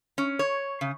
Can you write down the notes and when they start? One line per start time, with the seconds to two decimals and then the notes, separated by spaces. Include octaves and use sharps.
0.18 C#4
0.39 C#5
0.81 C#3